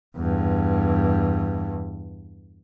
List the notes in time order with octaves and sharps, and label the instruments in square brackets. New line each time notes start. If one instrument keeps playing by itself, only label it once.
[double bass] E2 G2